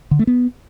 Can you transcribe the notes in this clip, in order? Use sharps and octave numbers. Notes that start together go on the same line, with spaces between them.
D3
A3
B3